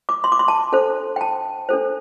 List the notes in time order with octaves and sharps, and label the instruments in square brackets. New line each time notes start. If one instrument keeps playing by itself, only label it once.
[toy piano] D6
C6
D6
C6
A5
D4 A4 C5
G5
A5
D4 A4 C5